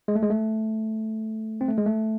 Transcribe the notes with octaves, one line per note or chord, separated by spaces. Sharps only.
G#3
A3
G#3
A3
C4
A3
G#3
A3